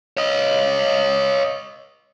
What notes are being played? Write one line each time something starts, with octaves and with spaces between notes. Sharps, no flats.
C#5 D#5